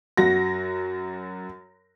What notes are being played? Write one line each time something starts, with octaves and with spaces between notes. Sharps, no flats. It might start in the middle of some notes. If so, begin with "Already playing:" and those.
F#2 F#4 A#6